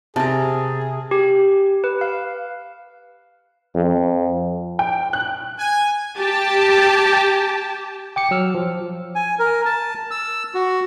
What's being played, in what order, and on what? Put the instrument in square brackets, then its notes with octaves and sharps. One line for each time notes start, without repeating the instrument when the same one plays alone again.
[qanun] C3 A#4 [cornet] G#4 [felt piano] A5
[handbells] G4
B4
F5
[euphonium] F2
[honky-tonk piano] G5
F#6
[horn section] G#5
[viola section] G4 A5
[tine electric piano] G5 D6 C#7
F#3 E6 F6
F3
[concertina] G#5
A#4
A5
E6
F#4